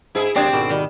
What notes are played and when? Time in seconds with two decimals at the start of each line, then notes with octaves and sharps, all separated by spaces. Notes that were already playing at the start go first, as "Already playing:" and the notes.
0.15 G#2 E4 G#4
0.36 D#2 G#3 C4 D4 G4 D5
0.53 G#1 B2
0.71 D#3 G3